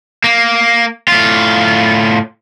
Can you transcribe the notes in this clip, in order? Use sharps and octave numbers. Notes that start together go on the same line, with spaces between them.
A#3
A2 F4